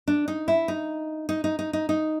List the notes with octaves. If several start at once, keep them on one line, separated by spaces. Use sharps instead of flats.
D4
D#4
E4
D#4
D#4
D#4
D#4
D#4
D#4